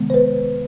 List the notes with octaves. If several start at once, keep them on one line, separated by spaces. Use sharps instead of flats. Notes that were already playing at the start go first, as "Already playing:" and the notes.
Already playing: C3 D#3 G#3 B3
C5
B4